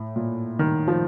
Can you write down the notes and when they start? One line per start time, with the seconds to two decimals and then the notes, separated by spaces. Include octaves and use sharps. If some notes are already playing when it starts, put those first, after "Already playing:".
Already playing: A2
0.16 A#2
0.59 D#3
0.88 F3